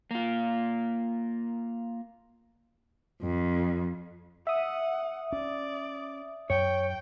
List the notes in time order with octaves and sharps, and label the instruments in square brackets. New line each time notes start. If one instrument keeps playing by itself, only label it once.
[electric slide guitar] A#3 F4
[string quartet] F2
[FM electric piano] E5 D#6 [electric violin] F#5
[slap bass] C#4 [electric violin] D5
[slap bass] F#2 [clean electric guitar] C#5 [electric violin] G5